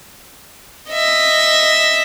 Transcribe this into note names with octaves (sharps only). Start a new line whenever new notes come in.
D#5 E5